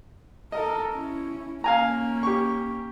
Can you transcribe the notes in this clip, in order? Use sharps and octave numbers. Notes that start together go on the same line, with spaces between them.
A4 A#4 D#5
C#4 E4
A#3 C#4 F5 G#5 A#5
G4 C#6